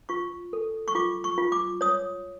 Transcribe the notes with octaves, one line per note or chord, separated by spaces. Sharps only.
F4 C#6
A4
C#6
F4 D6
C#6
F4
D6
C#5 D#6